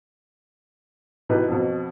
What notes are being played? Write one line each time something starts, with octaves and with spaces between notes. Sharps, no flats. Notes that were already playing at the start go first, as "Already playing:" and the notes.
B2 E3 D#4 G4 B4
F2 B2